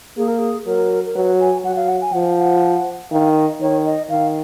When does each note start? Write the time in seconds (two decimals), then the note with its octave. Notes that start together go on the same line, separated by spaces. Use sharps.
0.17 A#3 G#4
0.28 A#4
0.38 G#4
0.66 F#3 A#4
1.06 A#4
1.15 F#3 B4
1.40 G#5
1.64 F#3 F#5
1.76 F5
1.88 F#5
2.01 G#5
2.13 F3 F#5
2.38 F#5
3.12 D#3 F5
3.36 D#5
3.60 D#3 C#5
3.85 D#5
4.10 D#3 F5